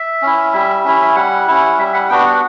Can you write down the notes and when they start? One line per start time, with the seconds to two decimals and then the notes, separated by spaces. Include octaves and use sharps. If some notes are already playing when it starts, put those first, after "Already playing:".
Already playing: E5
0.22 C#4 E4
0.53 G3
0.84 C#4 E4
1.15 G3 F#5
1.48 C#4 E4
1.79 G3 E5
1.94 F#5
2.09 B3 D4 F#4 G5
2.25 F#5